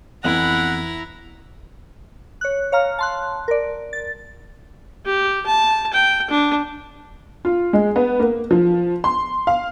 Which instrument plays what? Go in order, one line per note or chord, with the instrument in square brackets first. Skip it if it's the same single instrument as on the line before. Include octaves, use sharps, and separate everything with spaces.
[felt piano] F2 E3 B3 [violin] E4 A#5 [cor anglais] F#5
[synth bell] C#5 F#6
C#5 F5 A#5 F6
A5 C6 F#6
A#4 D5
A6
[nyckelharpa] G4
A5
G5
D4
[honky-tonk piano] F4
G#3
B3
A#3
F3
C6
F5